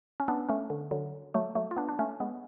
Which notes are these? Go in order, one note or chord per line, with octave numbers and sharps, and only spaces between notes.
C#4
B3 D4
A3 C#4
D3
D3 F#3
F#3 A3
F#3 A3
F4
B3 D4
D4
A3 C#4
G#3 B3